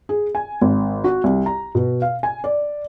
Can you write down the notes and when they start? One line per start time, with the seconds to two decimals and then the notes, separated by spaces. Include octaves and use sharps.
0.09 G#4
0.35 G#5
0.61 G#1
1.04 F#4
1.24 C2
1.46 A#5
1.75 B2
2.02 F5
2.23 G#5
2.44 D5